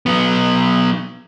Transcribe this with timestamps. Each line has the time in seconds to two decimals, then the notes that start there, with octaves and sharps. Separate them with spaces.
0.06 F#3 B3